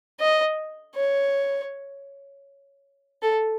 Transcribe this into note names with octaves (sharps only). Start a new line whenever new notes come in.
D#5
C#5
A4